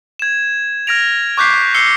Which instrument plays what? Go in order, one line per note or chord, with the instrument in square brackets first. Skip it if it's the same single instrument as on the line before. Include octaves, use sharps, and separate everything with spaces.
[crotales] G#6 E7
F6 G#6 A#6 D7 F7
C#6 D6 F#6 G6 B6 C7
E6 C7 C#7 G7